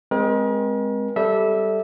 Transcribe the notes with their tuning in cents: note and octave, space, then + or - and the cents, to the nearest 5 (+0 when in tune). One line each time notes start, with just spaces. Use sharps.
G#3 +0 C4 -5 A#4 +45
G3 +0 A4 +0 E5 -20